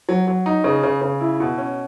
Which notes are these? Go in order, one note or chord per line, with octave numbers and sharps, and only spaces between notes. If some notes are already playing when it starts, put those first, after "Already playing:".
F#3
F#3
D#4
C#3
C#3
C#3
E4
B2
C#4